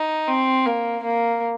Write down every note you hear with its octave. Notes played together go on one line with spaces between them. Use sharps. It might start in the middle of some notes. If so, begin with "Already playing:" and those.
Already playing: D#4
C4
A#3
A#3